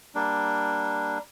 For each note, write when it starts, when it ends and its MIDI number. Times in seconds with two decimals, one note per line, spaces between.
0.15 1.18 55
0.15 1.18 58
0.15 1.18 62